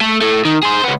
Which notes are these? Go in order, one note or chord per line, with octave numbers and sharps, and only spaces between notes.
A3
A2 A3
D#3
G#4 C5
C#2 B3